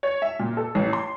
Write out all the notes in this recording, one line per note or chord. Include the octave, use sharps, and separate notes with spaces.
C#5
E5
A#2
A4
A1
C6